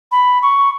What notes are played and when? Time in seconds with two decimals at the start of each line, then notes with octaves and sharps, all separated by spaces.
0.12 B5
0.42 C#6